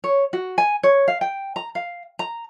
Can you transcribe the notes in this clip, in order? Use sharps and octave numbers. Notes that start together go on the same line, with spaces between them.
C#5
F#4
G#5
C#5
F5
G5
A#5
F5
A#5